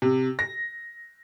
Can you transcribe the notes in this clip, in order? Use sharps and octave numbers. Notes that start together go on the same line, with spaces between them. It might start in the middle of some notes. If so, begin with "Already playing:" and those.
C3
A#6